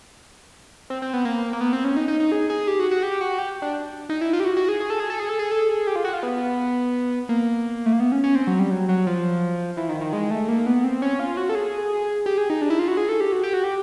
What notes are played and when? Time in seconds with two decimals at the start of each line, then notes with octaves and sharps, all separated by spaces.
0.90 C4
1.02 C4
1.13 B3
1.25 A#3
1.53 A#3
1.61 B3
1.73 C4
1.84 C#4
1.97 D#4
2.08 D#4
2.20 D#4
2.32 G#4
2.50 G#4
2.67 G4
2.79 F#4
2.91 F#4
3.03 G4
3.21 F#4
3.39 G4
3.62 D4
4.09 D#4
4.21 E4
4.33 F4
4.40 G4
4.45 F#4
4.57 F#4
4.69 G#4
4.80 G#4
4.90 A4
5.00 G#4
5.10 A4
5.20 G#4
5.29 A4
5.39 G#4
5.52 A4
5.69 G#4
5.87 G4
5.96 F4
6.05 F#4
6.14 F4
6.23 B3
7.29 A#3
7.86 A3
7.93 A#3
8.00 B3
8.12 C#4
8.24 C#4
8.35 C4
8.47 F#3
8.59 G3
8.71 F#3
8.89 F#3
9.07 F3
9.77 E3
9.89 D#3
10.01 D#3
10.13 G#3
10.31 A3
10.49 A#3
10.66 B3
10.84 C4
11.02 C#4
11.19 F4
11.37 F#4
11.49 A4
11.55 G#4
12.26 G4
12.38 G#4
12.50 D#4
12.62 D4
12.70 E4
12.79 F4
12.88 F#4
12.97 G#4
13.09 A4
13.21 G4
13.32 F#4
13.43 G4
13.53 F#4
13.64 G4